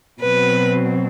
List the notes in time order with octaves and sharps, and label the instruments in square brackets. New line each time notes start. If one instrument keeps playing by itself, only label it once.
[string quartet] B2 F#3 C4 B4